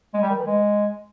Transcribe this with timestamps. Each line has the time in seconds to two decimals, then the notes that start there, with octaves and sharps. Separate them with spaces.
0.14 G#3
0.22 G3
0.30 D#3
0.38 E3
0.47 G#3